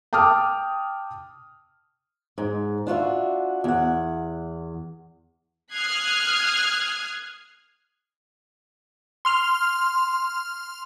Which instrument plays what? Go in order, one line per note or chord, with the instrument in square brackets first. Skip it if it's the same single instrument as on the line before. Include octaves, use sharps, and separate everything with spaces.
[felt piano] G5 A5 D6 D#6 F6
[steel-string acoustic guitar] G#2
D4 F4 F#4 E5
E2 F#5
[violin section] D#6 F6 F#6 G#6 C7
[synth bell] C6 F6 F7